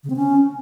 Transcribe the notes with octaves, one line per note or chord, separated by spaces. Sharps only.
C#3
C4
C#4